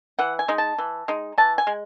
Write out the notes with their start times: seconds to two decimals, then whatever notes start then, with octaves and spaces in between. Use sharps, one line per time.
0.19 E3 F#5
0.39 G#5
0.48 G#3 D#4
0.58 A5
0.78 E3
1.08 G#3 D#4
1.38 E3 A5
1.58 G#5
1.67 G#3